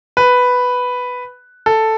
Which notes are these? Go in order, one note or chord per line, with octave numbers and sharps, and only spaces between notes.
B4
A4